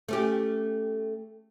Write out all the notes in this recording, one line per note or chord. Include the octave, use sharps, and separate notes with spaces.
A3 C#4 G4